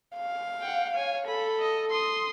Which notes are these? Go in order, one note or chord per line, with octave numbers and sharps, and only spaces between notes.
F5
F#5 G5
C#5 G#5
A4 B5
D#5
C6 D#6